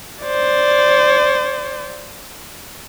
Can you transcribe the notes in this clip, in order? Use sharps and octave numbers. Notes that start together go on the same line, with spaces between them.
C5 D5